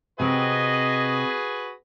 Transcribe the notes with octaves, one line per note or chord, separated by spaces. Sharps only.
C3 C4 F#4 G#4 B4 D#5